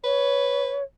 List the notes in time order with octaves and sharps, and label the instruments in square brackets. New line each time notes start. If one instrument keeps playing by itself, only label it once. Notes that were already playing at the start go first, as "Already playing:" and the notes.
[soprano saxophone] B4 [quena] C#5